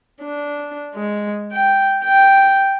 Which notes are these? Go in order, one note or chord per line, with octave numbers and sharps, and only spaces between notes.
D4
G#3
G5
G5